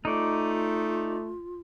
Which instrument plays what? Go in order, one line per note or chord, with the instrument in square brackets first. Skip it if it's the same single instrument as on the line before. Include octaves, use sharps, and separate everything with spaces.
[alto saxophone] A3 [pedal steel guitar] D#4 D5 [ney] F4